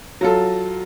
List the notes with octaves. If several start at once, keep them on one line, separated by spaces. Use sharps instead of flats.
F#3 F4 A4